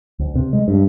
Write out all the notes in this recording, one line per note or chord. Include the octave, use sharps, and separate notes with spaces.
D2
C3
G#3
G2